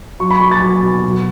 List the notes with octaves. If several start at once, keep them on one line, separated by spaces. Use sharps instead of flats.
F#3 C#6
B5
F#3 C#6
A6
F#3
B2
F#3